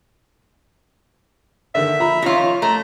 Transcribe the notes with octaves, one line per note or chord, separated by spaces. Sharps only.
D3 D#3 E5
F3 A#5 B5
D#3 F3 C#4 F4
A3 A#5